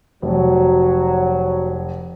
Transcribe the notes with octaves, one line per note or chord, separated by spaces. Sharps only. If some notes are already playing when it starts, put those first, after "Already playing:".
F1 F#3